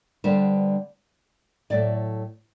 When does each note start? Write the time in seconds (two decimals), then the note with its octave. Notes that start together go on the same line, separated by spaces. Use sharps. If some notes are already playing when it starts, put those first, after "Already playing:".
0.24 D3 G3 B3 D4 C5
1.70 A2 F#3 A3 D5